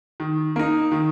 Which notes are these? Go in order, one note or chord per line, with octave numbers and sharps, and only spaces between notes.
D#3
A#3 D#4
D#3